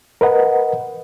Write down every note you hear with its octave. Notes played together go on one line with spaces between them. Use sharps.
A#4 B4 D#5 F#5